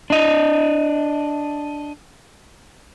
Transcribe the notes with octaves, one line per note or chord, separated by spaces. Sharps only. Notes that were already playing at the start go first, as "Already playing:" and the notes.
D4 D#5